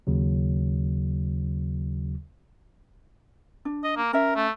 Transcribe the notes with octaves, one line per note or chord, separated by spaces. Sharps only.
D#2 C#3 F#3
D4
D#5
A#3
C#4 A#4 E5
A3